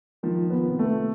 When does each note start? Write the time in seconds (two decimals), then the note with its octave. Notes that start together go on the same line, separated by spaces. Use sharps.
0.23 D#3 F3
0.50 B3
0.65 C3
0.79 A3